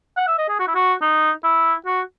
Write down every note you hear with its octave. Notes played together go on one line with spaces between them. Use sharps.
F#5
E5
D#5
G#4
F#4
E4
F#4
D#4
E4
F#4